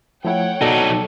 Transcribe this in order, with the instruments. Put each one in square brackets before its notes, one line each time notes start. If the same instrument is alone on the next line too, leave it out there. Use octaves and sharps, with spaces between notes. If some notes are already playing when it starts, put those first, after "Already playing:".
[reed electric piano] F3 A3 E4 [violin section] C#5 F#5 G5
[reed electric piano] B2 [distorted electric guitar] F#3 D#4 [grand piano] A4 D5